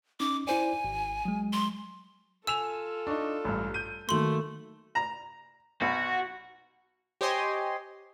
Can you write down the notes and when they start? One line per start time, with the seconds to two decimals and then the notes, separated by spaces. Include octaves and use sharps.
0.20 C#4 D#4 D6
0.47 E4 C5 D5 G#5
0.84 G#1
1.25 F#3 G#3
1.53 C6
2.47 F4 A4 G#5 E6 E7 F7
3.07 D4 D#4 C#6
3.45 A1 G2 A#5 F6
3.74 G6 D#7
4.09 D#3 F#3 A3 A#3 C6 F#7
4.95 A#5
5.81 B1 F#4
7.21 G4 C5 C#5 D#5 G#5 C6